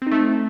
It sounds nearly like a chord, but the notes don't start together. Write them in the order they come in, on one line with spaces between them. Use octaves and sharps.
C4 D#4 A3